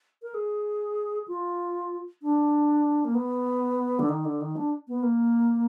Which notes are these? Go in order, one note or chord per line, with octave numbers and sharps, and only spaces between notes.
A#4
G#4
F4
D4
A#3
B3
D3
D#3
D3
D#3
D4
B3
A#3